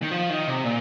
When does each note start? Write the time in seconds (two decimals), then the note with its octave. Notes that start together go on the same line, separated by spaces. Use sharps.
0.02 D#3
0.11 F3
0.30 D#3
0.48 C3
0.64 A#2